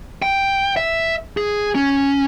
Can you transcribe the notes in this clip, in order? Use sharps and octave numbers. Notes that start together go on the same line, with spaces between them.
G5
E5
G#4
C#4